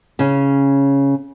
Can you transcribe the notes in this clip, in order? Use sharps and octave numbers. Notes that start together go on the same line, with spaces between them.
C#3 C#4